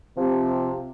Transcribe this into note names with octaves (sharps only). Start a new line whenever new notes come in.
C3 F3